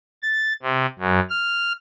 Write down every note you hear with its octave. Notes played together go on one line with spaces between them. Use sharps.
A6
C3
F#2
F6